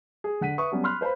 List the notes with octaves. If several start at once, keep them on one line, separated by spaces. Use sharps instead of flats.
G#4
D3 F#5 B6 D#7
B4 E5 C#6 D#6
F#3 G3 B3 C#4
B5 C6 F6 F#6
B4 C5 F5 B5